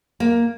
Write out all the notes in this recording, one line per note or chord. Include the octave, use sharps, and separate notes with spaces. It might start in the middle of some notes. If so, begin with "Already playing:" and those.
A#3